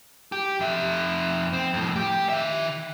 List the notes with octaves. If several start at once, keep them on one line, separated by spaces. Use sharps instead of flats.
G4
F2 E5
C4
F2 A2
G4
D#3 E5